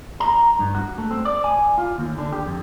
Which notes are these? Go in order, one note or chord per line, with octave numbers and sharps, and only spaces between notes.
A#5
G2
F#4
A3
C4
D5
G#5
F4
D#2
D3
G4
F2